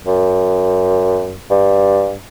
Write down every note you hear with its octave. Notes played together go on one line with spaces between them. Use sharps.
F#2
G2